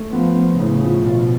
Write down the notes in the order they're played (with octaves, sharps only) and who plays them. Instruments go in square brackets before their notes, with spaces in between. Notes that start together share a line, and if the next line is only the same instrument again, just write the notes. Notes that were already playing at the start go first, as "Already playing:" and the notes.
Already playing: [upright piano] A3
[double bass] F3 [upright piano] B3
[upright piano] B3
[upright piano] A2 [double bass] C#3
[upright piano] F3
[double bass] B2 [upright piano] F4